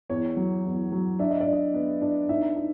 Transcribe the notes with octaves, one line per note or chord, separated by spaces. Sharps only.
E2 C#5
F#3
E2
F#3
D4 E5
D#5
D5
D4
D#5
B3
D4
D#4 E5
D#4